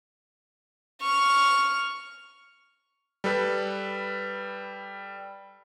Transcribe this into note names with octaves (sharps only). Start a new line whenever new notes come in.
C#6 F6
G3 A4 B4